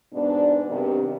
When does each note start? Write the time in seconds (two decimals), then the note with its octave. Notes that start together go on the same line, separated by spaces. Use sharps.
0.13 G#2 B2 B3 D4
0.69 G2 C3 D#3